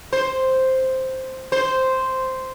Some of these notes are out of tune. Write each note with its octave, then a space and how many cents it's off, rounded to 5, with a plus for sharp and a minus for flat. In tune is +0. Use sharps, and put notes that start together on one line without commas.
C5 +0
C5 -5